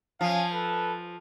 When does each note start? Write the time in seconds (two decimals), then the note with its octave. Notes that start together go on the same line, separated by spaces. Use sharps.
0.21 F3 C#4 F5 G#5
0.52 A4 B4